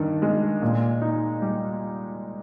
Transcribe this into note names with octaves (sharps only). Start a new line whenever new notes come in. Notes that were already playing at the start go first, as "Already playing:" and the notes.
Already playing: G2 D#3
G#3
A#2
D#4
G3